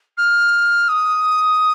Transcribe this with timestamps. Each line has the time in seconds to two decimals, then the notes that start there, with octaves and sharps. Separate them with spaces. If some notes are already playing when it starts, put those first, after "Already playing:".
0.17 F6
0.88 D#6